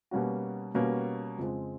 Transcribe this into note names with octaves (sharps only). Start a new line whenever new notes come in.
B2 G3 A#3 C#4 F#4
B2 G3 A#3 C#4 F#4
F2 C#3 F3 G#3 C4